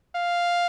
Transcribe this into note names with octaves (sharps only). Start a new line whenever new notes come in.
F5